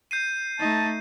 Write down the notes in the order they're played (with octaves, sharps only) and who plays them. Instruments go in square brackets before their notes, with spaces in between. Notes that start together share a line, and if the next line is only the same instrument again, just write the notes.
[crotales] G6 C7 D#7
[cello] A3 D#4 [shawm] A5